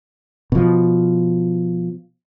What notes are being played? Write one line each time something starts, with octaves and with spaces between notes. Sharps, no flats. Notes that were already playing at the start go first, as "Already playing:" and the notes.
B2 F3